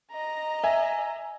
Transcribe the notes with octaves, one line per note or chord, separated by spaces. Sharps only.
D#5 A#5
E5 G#5